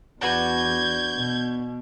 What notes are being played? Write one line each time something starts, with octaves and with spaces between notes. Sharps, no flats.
E2 D4 F#4 B4 G6 G#6
B2